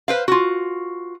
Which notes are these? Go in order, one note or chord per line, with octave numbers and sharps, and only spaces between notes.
B4 C5 F5
F4 F#4